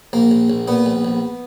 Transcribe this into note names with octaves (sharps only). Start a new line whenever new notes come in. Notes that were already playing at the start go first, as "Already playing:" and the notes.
A#1 A#3
A#1
A#1
A#2 B3
A#1
A#1